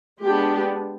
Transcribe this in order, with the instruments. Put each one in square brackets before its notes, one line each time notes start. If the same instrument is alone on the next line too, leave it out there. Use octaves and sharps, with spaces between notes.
[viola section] G#3 B3 D4 G4